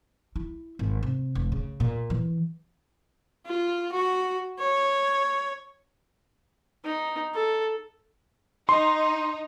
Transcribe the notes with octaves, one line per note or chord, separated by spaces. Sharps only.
E4
G#1
C3
F1
C#3
A#2
E3
F4
F#4
C#5
D#4
A4
D#4 C6